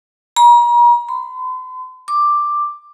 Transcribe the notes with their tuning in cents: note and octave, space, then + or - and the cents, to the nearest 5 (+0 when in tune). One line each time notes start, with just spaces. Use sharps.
A#5 +40
C6 -45
D6 +5